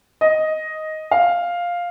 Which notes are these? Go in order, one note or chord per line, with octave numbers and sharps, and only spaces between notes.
D#5
F5